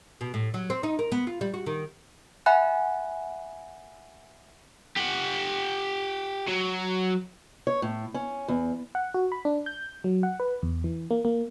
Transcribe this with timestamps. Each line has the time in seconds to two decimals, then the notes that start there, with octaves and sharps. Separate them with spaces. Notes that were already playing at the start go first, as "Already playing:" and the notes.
0.21 B2
0.34 A2
0.54 F#3
0.70 C4
0.83 D#4
0.99 A#4
1.12 B3
1.27 F4
1.41 G3
1.54 F#4
1.66 D#3
2.46 E5 F#5 G#5 B5 F#6
4.97 G4 F#5
6.48 F#3
7.67 C#5
7.82 A2
8.14 C#4
8.48 E2
8.95 F#5
9.14 F#4
9.32 B5
9.45 D4
9.66 G6
10.04 F#3
10.23 F#5
10.40 B4
10.62 E2
10.84 E3
11.11 A#3
11.25 A#3